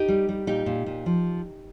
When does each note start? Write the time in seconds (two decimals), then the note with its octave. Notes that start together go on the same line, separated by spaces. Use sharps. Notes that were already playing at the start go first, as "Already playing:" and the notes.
Already playing: D#4 G4
0.08 G3
0.29 G3
0.47 A#2 D#4 G4
0.66 A#2
0.86 A#2
1.06 F3